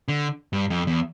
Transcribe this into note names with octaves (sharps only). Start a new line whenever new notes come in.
D3
G2
F2
E2